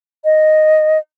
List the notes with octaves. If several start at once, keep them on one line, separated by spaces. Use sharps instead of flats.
D#5